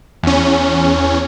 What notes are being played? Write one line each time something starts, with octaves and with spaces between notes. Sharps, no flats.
E2 C#4